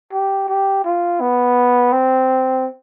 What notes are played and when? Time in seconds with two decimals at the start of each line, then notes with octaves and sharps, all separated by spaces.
0.13 G4
0.49 G4
0.85 F4
1.21 B3
1.93 C4